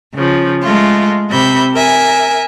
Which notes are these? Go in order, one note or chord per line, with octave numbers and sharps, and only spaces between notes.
C#3 F3
G#3 A3 F4
C3 E5 B5 G6
A#4 E5 G#5